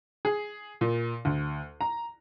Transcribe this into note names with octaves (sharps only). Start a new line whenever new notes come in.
G#4
A#2
D2
A#5